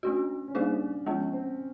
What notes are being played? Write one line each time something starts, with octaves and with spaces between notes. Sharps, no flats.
A3 C#4 D4 F#4
C#4
G3 A#3 D4 D#4 G#4
F3 G#3 B3 C#4
C4